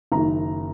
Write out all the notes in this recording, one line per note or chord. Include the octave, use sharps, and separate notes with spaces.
F#1 F#2 D#3 A#5